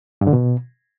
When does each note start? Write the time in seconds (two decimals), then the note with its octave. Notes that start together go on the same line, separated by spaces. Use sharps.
0.21 G2
0.27 D3
0.33 B2